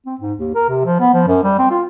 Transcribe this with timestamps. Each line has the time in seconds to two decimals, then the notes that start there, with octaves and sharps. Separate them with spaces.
0.06 C4
0.20 G#2
0.38 D#2
0.55 A#4
0.69 C3
0.85 F3
1.00 B3
1.14 F3
1.27 F#2
1.43 G3
1.58 C4
1.70 F4